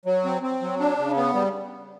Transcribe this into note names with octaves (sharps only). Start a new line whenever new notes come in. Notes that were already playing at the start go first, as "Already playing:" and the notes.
F#3
C4
C4
F#3
D4
C#3
B3
G3